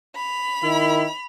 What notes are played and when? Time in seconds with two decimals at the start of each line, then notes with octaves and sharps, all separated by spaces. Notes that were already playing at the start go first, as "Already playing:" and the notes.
0.16 B5 F7
0.63 D#3 E4